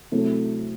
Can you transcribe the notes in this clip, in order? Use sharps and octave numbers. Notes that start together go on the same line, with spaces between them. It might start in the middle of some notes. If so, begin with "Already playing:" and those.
C3 F#3 A3 E4 A4